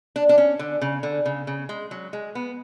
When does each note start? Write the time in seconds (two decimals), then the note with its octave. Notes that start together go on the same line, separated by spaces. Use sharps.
0.16 D4
0.29 D4
0.38 C#4
0.59 D3
0.81 C#3
1.03 D3
1.26 C#3
1.47 C#3
1.69 G#3
1.91 F#3
2.13 G#3
2.35 B3